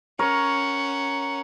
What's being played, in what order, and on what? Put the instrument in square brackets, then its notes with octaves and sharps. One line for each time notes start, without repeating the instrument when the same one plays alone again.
[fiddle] C#4 F#5 [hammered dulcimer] A#4 C#5